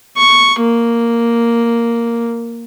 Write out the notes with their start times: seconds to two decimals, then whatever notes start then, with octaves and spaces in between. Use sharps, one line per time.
0.17 C#6
0.60 A#3